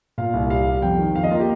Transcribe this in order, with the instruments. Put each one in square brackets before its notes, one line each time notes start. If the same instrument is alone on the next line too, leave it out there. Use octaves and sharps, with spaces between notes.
[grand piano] A#2 F5
C2
G3 F5
G3
F2 G5
D#3
F2 F5
D#5
A#3 F4
G4